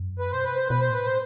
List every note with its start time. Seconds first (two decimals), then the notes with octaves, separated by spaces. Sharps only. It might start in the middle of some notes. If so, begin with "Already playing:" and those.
Already playing: F#2
0.19 B4
0.32 B2 C5
0.44 B4
0.52 C3 C5
0.68 B2 B4
0.81 C5
0.90 A2 B4
1.06 C5